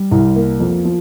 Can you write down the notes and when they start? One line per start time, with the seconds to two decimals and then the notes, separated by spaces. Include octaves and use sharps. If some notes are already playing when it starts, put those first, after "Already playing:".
Already playing: G3
0.11 C2
0.36 A#3
0.60 F2
0.85 F3